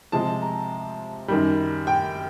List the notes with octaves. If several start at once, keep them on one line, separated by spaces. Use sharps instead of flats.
C3 F3 G#3 A5
A#5
F#2 D#3 G3
G5